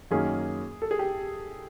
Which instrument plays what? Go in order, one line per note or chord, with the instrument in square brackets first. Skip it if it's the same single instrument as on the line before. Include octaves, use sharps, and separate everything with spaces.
[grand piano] F#2 D#3 F#3 A#3 C#4 [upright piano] G#4
[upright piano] A4
G#4
G4